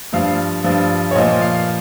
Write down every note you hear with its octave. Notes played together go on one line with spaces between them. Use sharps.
G2 F3 F5
G2 F3
C#5
A#2 F3 D#5
F5